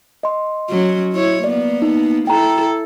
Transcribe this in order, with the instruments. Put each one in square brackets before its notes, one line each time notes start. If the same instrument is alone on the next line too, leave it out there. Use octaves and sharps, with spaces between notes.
[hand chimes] D#5 C6
[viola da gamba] F#3 C#4
E4 C#5
[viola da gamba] A#3 B3 [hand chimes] D5
[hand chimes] D#4
[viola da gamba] E4 A4 [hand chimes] G5 A#5